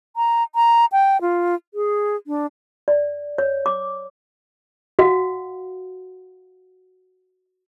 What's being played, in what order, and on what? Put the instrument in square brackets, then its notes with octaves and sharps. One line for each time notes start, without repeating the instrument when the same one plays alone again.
[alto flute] A#5
A#5
G5
F4
G#4
D4
[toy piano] D5
C#5
D6
F#4 F5 F#5